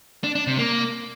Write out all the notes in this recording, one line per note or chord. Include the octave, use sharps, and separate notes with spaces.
D4
D4
C3
A#3